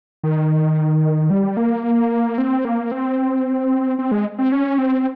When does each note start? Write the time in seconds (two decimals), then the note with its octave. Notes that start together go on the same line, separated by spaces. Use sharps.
0.23 D#3
1.30 G3
1.57 A#3
2.38 C4
2.65 A#3
2.91 C4
3.99 C4
4.12 G#3
4.38 C4
4.52 C#4
4.78 C4